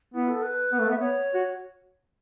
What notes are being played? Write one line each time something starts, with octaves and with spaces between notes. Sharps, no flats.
B3 E4
A4
B4
B3
A3
B3 E5
B3 C#5
F#4